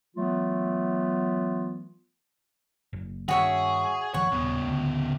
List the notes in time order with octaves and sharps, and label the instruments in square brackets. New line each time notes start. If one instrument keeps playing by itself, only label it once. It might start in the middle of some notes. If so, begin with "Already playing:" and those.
[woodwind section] E3 F#3 A3 B3 F4
[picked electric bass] F#1
[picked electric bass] G2 D#3 C#4 [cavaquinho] F#4 C#5 E5 [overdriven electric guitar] G#4
[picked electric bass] G1 D#3 F3 [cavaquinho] C#5 [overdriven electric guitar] F#5
[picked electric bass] D#1 [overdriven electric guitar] C#3 B3
[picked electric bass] D2